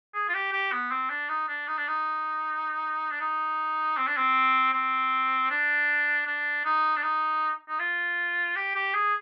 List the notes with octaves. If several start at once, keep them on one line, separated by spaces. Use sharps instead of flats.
G#4
F4
G4
G4
B3
C4
D4
D#4
D4
D#4
D4
D#4
D4
D#4
C4
D4
C4
C4
D4
D4
D#4
D4
D#4
D#4
F4
G4
G4
G#4